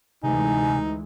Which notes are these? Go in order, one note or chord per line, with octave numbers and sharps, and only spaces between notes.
D2 C3 E3 G#3 D#4 G#5